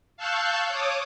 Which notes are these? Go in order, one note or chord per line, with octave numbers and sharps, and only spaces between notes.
F5 A5 C#6 E6 F#6 G6
C#5 D6 D#6